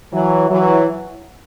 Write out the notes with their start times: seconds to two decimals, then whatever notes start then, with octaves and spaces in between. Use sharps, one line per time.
0.13 E3 F#3
0.50 E3 F#3